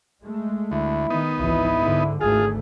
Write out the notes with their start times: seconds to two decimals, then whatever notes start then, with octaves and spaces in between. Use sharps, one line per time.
0.24 G#3 A3
0.72 D2 E4
1.10 D#3 B3 D#4
1.40 G#1 C#2 E3 E4
1.80 G#2 D3
2.21 G#1 D2 A3 F4 G#4